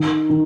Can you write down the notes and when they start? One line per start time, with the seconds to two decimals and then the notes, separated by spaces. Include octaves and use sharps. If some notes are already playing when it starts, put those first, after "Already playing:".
Already playing: D#3
0.30 D#3